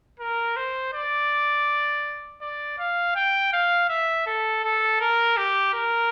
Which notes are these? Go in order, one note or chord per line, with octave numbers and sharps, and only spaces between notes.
A#4
C5
D5
D5
F5
G5
F5
E5
A4
A4
A#4
G4
A#4